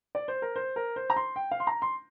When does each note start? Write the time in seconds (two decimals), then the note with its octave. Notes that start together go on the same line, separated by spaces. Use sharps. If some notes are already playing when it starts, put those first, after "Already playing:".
0.15 D5
0.28 C5
0.42 A#4
0.56 C5
0.76 A#4
0.96 C5
1.10 A#5
1.16 C6
1.36 G5
1.51 F5
1.60 C6
1.67 A#5
1.82 C6